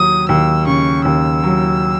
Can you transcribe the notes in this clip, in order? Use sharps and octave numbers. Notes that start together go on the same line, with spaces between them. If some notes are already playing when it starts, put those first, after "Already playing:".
Already playing: D#2 F#3 D#6
D#2 E6
C#3 C#6
D#2 E6
F#3